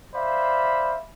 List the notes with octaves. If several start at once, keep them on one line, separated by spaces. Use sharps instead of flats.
C5 D5 E5 F5 B5